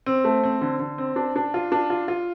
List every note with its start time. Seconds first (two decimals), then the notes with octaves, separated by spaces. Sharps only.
0.06 C4
0.24 A3
0.44 C4
0.61 D3
0.79 D3
0.98 C4
1.16 D4
1.36 D4
1.54 F4
1.72 D4
1.90 F4
2.08 F4